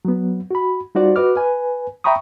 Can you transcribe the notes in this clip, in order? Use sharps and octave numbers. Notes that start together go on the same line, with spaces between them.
F#3 B3
F#4 B5
G3 D#4 F4 F#4 C5 D5
F#4 B4 D#5 D6 F6
B4 G#5
E5 G5 A#5 B5 C#6 D#6